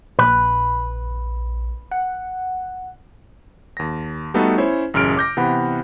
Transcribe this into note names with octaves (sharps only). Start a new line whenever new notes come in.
A#1 B4
F#5
D#2 A#6
G3 A3 B3 D#4 F#4 A4
C#4 E4 C5 C#5
A1 F#2 C#3 F6 D7
D6 G6 A#6
C3 E3 B3 F#5 B5